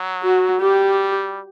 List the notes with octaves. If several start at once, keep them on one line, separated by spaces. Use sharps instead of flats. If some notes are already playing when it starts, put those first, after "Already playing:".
Already playing: F#3
F#4
G3 G4